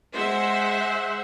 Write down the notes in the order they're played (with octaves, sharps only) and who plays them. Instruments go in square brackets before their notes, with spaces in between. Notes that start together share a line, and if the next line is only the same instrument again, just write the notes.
[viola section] G#3 C5 E5 F#5